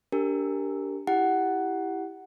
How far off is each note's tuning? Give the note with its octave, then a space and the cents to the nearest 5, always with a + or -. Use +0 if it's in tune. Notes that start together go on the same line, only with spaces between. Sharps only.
D4 -20 G4 +0 A#4 -15
E4 +0 G4 +0 F#5 +10